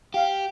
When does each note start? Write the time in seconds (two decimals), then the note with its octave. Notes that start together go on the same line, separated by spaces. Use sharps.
0.14 G4 F5